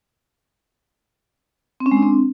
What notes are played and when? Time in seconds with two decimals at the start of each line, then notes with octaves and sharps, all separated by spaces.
1.80 C4
1.86 C#4
1.91 G#3
1.97 D4
2.02 C4